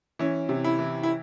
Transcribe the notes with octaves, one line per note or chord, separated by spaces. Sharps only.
E3 C#4
C3
E4
E3
E4